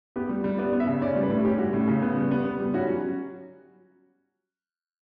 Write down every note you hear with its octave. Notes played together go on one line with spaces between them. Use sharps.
B3 G4
G3
G3
B3 D5
B3
E5
C#3
C#4 D5
G3
B4
A2
C#4 G4
G3 F#4
A2
C#3
B3
G3
B3
B3
G3
C#4 F#4
F#3